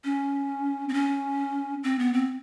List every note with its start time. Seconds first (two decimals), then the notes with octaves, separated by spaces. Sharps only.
0.04 C#4
0.89 C4
0.94 C#4
1.83 C4
1.99 B3
2.13 C4